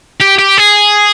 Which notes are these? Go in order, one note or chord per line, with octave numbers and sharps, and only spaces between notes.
G4
G4
G#4